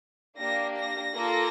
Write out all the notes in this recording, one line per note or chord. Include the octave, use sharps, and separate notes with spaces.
A#3 D4 G4 A#6
A#6
A#3 F4 A4